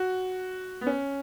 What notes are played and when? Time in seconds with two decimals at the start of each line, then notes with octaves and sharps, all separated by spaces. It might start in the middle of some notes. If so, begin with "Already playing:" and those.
Already playing: F#4
0.81 B3
0.87 C#4